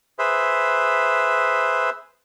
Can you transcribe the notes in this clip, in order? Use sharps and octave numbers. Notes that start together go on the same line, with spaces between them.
G#4 B4 C5 E5